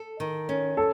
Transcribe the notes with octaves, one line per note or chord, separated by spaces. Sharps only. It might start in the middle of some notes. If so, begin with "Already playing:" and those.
Already playing: A4
D#3
C#4
A4